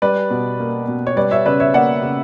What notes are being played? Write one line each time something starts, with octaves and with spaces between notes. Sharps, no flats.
G3 B4 D5
B2
A#3
B2
C#5
G3 B4 D5
C#5 E5
C#3 B4 D5
C#5 E5
A#3 D5 F#5
C#3